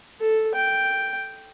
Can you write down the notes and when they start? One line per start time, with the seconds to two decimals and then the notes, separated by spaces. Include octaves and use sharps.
0.20 A4
0.54 G5